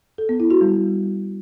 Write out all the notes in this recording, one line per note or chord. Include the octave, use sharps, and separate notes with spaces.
A4
B3
E4
F#4
G3